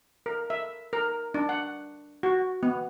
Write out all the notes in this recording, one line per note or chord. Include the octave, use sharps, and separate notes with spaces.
A#4
E5
A#4
D4
F#5
F#4
B3